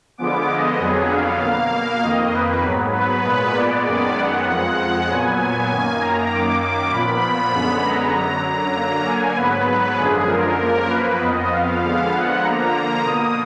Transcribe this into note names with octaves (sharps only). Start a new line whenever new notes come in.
D3 F3 G#3 B3 D6
D#5
F2 D3 F#3 B3 G#4
F5
B2 A#3 F5
F2 D#3 A#3 D#5
B4
G#2 F#3 B3
B4
A#2 G#3 B3
D5
F#2 D#3 G#3 B3
F#5
F2 F3 G#3 F#5
A#2 F#3 B3 G#5
F#2 D#3 A#3
A#5
F#2 D#3 A#3 D6
D6
A#2 F3 B3 B5
F#2 D3 G#3 B3
A#5
F#2 D3 F#3 A#5
A#5
D3 F#3 A#3
G#5
G#2 F#3 B3 B4
B4
F#2 D3 F3 G#3 G#4
A#4
F#2 F3 A#3 A#4
B4
F2 F3 B3 D#5
F5
D3 F3 G#3 B3
F#5
D3 F3 A#3 A#5
B2 A#3 D#6